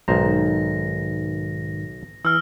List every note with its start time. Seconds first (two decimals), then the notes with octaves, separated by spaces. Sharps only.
0.08 B1 G#2 D#3 C5 A#5 A#6
2.25 E3 E6 F6